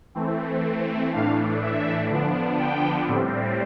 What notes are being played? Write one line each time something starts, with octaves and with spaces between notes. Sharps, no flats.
E3 A3 C4
A2 E3 A3 D4 F5
E5
D3 F3 B3 D4
G5
A2 G3 C4